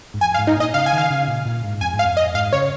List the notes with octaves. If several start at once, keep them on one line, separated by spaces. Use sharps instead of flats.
G#2
F2 G#5
F5
G#2
D#4
A#2 D#5
C#3 F5
G#5
D#3
F5
C#3
A#2
A#2
G#2
F2 G#5
G#2
F5
F2
D#5
G#2 F5
C#3 C#5